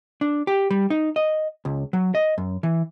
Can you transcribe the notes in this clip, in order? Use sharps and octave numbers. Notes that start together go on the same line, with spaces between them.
D4
G4
G3
D#4
D#5
C#2
F#3
D#5
F#2
E3